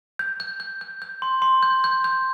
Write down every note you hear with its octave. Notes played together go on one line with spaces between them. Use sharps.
G6
G6
G6
G6
G6
C6
C6
G6
G6
G6